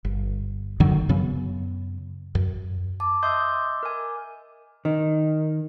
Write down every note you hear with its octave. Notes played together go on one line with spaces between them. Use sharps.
G1
F#2 D3 D#3 F#3
F#2 C#3 F#3 B3
F#2
A5 D6
D#5 E5 C6 D#6 E6 G6
A#4 G#5
D#3